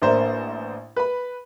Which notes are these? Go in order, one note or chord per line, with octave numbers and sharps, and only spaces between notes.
A1 A#3 D4 C5 E5 A#5
B4 B5